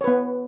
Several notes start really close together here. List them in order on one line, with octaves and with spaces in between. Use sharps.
C#5 B4 B3